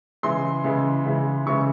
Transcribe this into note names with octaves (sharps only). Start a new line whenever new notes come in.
C#3 E3 G#3 C6
C#3 E3 G#3
C#3 E3 G#3
C#3 E3 G#3 C#6